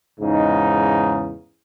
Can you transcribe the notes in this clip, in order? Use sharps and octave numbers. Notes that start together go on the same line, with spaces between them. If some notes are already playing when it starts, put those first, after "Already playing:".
E2 G#2 C#3 D#4